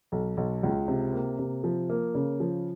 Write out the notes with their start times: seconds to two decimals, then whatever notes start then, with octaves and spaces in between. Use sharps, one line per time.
0.12 B1
0.37 B1
0.63 C#2
0.88 C3
1.13 A#3
1.39 C3
1.64 F3
1.90 A#3
2.15 C#3
2.40 F3